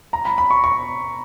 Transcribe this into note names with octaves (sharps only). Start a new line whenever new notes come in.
A#5
B5
B5
C#6
C#6